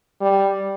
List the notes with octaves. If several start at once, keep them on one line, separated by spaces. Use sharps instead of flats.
G3